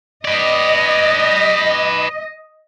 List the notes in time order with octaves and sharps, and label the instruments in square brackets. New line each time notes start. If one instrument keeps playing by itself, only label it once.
[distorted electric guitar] B4 D5 [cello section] D#5